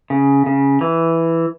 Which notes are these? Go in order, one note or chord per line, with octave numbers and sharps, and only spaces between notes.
C#3
C#3
E3